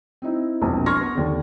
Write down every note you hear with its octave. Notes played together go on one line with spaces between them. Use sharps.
C4 D#4 E4
E1 A#1 F2
C6 C#6 F6 G#6 A#6
B3
D#2 D3